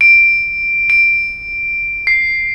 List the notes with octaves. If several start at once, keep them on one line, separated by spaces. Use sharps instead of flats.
D7
D7
C7